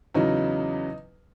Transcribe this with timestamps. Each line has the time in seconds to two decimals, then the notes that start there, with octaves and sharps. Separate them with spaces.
0.15 E2 C#3 F#3 D#4